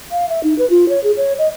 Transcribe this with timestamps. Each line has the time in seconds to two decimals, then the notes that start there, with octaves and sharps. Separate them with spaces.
0.11 F5
0.29 E5
0.44 D#4
0.58 B4
0.70 F4
0.89 C#5
1.04 G#4
1.17 C#5
1.38 D#5